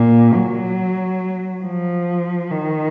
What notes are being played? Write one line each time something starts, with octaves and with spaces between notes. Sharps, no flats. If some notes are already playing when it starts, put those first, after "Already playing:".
Already playing: A#2
F#3
F3
D#3